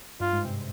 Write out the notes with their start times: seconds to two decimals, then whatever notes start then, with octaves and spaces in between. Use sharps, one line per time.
0.20 G2 F4
0.33 G#2
0.45 C3